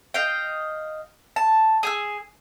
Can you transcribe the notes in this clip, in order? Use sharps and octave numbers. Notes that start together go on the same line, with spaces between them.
D#5 F5 G5
A5
G#4 G#5 E6